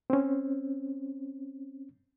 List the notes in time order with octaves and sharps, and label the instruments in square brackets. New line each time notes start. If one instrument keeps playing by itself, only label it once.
[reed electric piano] C4 C#4